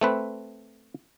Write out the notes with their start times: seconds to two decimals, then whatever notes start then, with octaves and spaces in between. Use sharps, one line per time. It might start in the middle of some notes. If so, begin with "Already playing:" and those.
0.01 A3 C4 B4